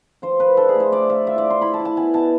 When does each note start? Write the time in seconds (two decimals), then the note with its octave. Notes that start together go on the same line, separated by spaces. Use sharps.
0.22 F3 C5
0.40 F3 B4
0.57 D4 A4
0.69 G#4
0.75 A3
0.80 C5
0.92 F4 D5
1.10 F4 E5
1.27 F4 E5
1.38 D5
1.44 F4
1.50 C6
1.61 E4 B5
1.74 A5
1.80 E4
1.85 A5
1.96 B3 G#5
2.14 B2 A5